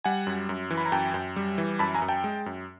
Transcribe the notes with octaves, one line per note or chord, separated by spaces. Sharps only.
G3 F#5 G#5
F#2
F#2
E3
B5
A#5
F#2 G5 A5
F#2
G3
E3
F#2 A5 B5
G#5 A#5
F#2
G5 A5
G#3
F#2